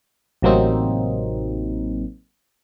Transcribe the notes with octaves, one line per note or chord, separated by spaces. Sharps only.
A1 C3 F#3 A#3 C4 D#4